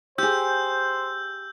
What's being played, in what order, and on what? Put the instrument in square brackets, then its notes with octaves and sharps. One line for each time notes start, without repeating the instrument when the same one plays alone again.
[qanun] G4 G#4 [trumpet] C5 [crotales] E6 G6